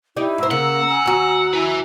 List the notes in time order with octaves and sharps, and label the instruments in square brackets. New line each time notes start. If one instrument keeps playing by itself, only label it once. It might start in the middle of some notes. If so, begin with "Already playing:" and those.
[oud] D#4 G4 D5 [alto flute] E4
[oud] G#2 C5 [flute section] A#5 E6
[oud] C#3 [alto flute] A#3 [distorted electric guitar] F#5
[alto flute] G#5
[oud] D#2 F#4
[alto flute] E4 [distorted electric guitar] B4 G#5